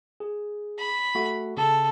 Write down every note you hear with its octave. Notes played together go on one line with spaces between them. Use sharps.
G#4
B5
A3 F#4
C#3 A4